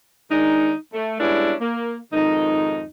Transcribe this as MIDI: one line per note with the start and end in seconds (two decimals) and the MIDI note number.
0.31 0.73 51
0.31 0.73 56
0.31 0.73 62
0.31 0.73 63
0.94 1.16 57
1.20 1.54 55
1.20 1.54 56
1.20 1.54 59
1.20 1.54 61
1.20 1.54 62
1.20 1.54 64
1.61 1.97 58
2.13 2.85 41
2.13 2.85 44
2.13 2.85 51
2.13 2.85 63